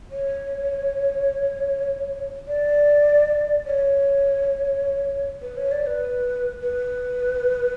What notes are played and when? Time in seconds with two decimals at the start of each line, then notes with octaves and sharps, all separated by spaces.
0.11 C#5
2.48 D5
3.66 C#5
5.42 B4
5.57 C#5
5.71 D5
5.86 B4
6.61 B4